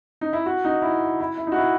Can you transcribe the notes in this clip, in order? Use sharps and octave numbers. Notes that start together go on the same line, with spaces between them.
D#4
E4
F#4
D#4
E4
E4
E4
D#4
F#4
E4